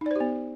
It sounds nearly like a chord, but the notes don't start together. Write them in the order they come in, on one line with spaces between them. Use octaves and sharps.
D#4 D5 C5 G4 B3